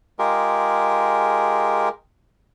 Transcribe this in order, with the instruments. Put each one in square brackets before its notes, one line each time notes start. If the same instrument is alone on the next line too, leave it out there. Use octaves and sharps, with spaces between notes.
[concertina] G#3 F4 G4 G#4 A#4